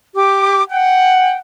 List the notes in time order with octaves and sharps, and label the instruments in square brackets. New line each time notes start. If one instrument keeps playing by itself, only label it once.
[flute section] G4 D6
[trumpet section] F#5 [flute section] G5